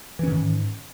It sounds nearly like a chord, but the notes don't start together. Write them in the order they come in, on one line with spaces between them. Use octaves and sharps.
E3 C#4 D#3 G#2